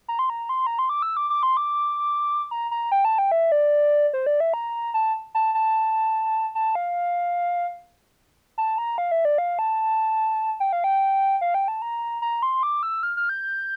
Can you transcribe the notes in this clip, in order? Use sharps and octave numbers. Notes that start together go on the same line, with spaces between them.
A#5
C6
A#5
C6
A#5
C6
D6
E6
D6
D6
C6
D6
A#5
A#5
G5
A5
G5
E5
D5
C5
D5
E5
A#5
A5
A5
A5
A5
F5
A5
A#5
F5
E5
D5
F5
A5
G5
F5
G5
F5
G5
A5
A#5
A#5
C6
D6
E6
F6
F6
G6